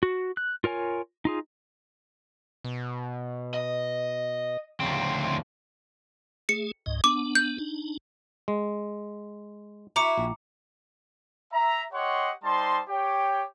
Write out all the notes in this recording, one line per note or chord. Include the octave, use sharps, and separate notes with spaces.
F#4
F#6
F4 A#4 C#5 G#5
D#4 F4 G#4
B2
D#5
D2 C#3 F3 C4
A3 G#4 C#7
C#2 G#2 D#5
B3 D4 D6
G6
D4 D#4
G#3
E4 F#4 A#5 D6 C#7
A#1
E5 A#5
G4 C#5 D#5 F#5 C6 C#6
G3 D#4 C5 A5 C6
G4 C#5 G5